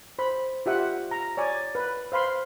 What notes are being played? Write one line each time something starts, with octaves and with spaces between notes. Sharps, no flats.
C5 B5
F4 G4 E5 F#5
A#5
C#5 D5 G#5
B4
C5 F5 B5 C6